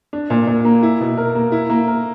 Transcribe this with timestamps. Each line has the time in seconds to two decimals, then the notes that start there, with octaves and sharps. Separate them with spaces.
0.13 D4
0.30 A#2
0.47 A#2
0.65 A#3
0.83 E4
1.00 B2
1.17 A#4
1.35 A#3
1.52 E4
1.70 A#3
1.88 A#4